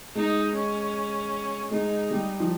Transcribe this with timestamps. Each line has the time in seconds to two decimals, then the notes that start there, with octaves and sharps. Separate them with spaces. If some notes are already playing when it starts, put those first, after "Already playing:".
0.15 G#3 D#4
0.55 C#4
1.71 G#3 D#4
2.11 G3
2.40 F3